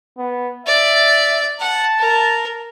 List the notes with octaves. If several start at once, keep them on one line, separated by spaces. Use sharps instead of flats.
B3
D5 E5
F#5 A5
A#4